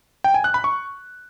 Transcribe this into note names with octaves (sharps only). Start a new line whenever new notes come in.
G5
G#5
F#6
B5
C#6